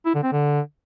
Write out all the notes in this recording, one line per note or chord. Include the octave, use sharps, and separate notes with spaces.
E4
D3
C4
D3